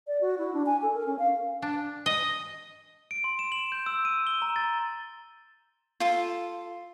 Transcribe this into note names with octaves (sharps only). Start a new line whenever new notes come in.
D5
F#4
E4
D4
G#5
A4
A#4
C#4
F5
D4
D#5
D7
C6
E7
F#7
G6
E6
D#7
G7
A#5
A6
F4 A4